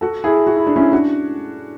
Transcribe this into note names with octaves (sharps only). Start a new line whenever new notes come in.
F#4 A4
E4 G#4
F#4
E4
D4
C#4 E4
D4 F#4